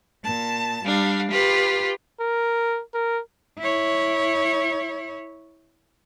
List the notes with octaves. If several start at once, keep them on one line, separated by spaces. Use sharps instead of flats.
A#2 A5
G3 D4 F5
F4 G4 B4
A#4
A#4
E4 C#5